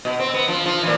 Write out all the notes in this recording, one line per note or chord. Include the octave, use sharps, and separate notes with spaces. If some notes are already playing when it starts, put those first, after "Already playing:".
B2
C4
B3
F3
F3
A#2 E3